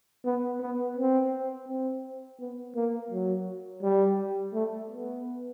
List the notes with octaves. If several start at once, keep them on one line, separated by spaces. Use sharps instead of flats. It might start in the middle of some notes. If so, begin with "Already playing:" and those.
B3
B3
C4
C4
B3
A#3
F#3
G3
A3
B3